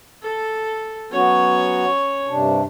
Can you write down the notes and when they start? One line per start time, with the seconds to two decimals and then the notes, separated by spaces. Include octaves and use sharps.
0.22 A4
1.12 F#3 B3 C#4 F#4 C#5
2.27 G2 C3 D4